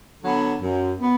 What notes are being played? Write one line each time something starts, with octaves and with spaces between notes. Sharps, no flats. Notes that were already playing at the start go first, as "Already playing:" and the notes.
D3 F#3 B3
F#2
B3